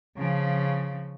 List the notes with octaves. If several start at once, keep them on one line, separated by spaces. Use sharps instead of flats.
C#3 F3